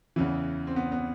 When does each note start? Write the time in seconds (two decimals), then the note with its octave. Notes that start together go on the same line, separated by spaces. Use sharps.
0.16 E2 C#3 E3
0.67 C4
0.76 B3
0.92 B3